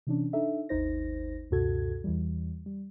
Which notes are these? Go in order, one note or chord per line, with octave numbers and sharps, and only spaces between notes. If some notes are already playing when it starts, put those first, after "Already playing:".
C3 E3 C#4 D4
D4 D#4 A4 E5
G#1 D#2 D#4 C5 A#6
C#2 F#2 B2 F#4 A4 G#6
E2 E3 G3
G3